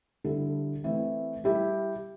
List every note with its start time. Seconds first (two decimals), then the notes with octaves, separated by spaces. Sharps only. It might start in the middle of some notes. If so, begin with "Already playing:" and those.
0.24 D3 G3 E4 A4
0.84 E3 A3 C4 E4
1.44 G3 E4 G4